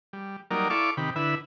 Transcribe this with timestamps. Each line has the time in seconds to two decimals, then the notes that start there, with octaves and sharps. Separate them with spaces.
0.13 G3
0.51 F#3 G3 A#3 D#4 A#4 D5
0.70 E4 A4 D5 F5 C#6 D6
0.97 C3 D#3 G4 B5
1.16 D3 E4 B4 E5